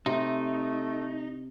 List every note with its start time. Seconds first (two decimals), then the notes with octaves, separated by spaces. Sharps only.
0.06 C3 A3 D#4